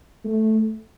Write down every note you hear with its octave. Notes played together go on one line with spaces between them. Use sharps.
A3